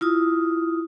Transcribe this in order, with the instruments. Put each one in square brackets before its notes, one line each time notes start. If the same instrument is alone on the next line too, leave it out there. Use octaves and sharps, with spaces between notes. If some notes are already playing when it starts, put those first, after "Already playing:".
[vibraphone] E4 F4 D#6